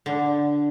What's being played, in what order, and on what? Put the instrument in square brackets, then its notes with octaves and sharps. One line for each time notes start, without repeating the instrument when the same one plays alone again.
[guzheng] D3